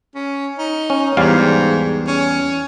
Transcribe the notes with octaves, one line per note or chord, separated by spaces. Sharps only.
C#4
D#4
C#4
E2 G#2 G3 F5
C#4